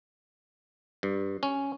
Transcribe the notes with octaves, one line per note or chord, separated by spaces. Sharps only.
G2
C#4